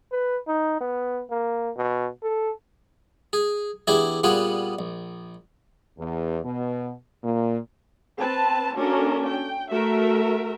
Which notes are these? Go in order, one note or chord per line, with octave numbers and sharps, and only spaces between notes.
B4
D#4
B3
A#3
B2
A4
G#4
E2 D4 E4 G4 G#4 E5
A#2 G3 B3 F4 G#4 F#5
A#1
E2
B2
A#2
C4 B4 A5
A#3 C#4 D4 F#4 A4 A#4
G5
A3 F#4 A#4 E5